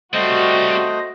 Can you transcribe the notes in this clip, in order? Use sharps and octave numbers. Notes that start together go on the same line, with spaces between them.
G3 A3 C4 F#4 C5 D#5